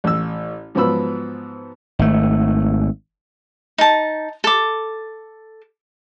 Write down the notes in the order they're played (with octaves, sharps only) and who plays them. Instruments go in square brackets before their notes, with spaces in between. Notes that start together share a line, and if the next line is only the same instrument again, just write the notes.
[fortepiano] A1 E6
G#2 F3 F#3 B3 B5 E6
[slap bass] G#1 A3
[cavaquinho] D#4 A5
A4 D6